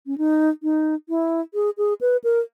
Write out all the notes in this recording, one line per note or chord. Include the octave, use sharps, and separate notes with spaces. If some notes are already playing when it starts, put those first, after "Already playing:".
C#4
D#4
D#4
E4
G#4
G#4
B4
A#4